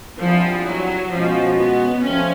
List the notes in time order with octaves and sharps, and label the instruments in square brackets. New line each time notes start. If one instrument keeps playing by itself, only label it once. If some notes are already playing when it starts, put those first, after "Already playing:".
[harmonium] D3 G3 C4 E4 G#4 [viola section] F3
[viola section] F#3
[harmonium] B2 G#3 C#4 F#4 [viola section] F3
[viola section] B3
[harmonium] F3 A3 C4 [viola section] C#4